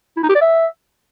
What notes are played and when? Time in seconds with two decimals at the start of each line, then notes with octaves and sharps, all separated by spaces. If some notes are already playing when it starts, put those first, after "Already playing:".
0.17 E4
0.23 D#4
0.29 G4
0.35 D5
0.41 E5